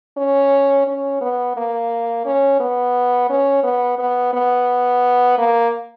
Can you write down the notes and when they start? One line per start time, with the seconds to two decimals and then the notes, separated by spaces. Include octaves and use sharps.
0.17 C#4
0.87 C#4
1.21 B3
1.57 A#3
2.26 C#4
2.60 B3
3.30 C#4
3.64 B3
3.99 B3
4.34 B3
5.38 A#3